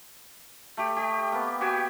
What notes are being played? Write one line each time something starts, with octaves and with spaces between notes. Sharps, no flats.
A3 G4
G4 D#5
A#3 B3
F#4 G4 G5 G#5